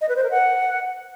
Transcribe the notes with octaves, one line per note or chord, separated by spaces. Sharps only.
D#5
B4
C5
A#4
F#5